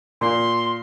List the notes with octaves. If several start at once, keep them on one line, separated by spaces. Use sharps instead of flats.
A#2 C6